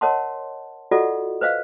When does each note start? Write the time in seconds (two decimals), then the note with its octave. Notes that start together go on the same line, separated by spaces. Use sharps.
0.01 A#4 C#5 D#5 F#5 A5 C6
0.91 F4 F#4 A4 D5 D#5 F#5
1.41 B4 C5 D#5 F5